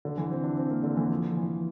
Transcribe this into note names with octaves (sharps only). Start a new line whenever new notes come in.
D3
E3
C4
D4
C4
A#3
D3
E3
F3
E3